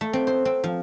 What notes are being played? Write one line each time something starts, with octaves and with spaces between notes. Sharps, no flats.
A3
C4
C5
C4
F3